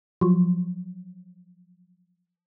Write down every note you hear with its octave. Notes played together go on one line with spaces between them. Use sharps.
F3 F#3